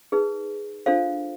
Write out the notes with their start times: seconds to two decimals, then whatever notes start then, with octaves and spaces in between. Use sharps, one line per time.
0.12 D#4 G#4 B4
0.86 D4 F4 A4 C5 F5